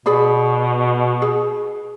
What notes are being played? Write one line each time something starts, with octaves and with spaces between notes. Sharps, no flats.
B2 G#4 D5 B5
G#4